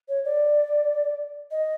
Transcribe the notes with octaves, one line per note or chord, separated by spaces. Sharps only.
C#5
D5
D#5